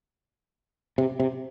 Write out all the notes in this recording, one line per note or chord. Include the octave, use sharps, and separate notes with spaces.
C3
C3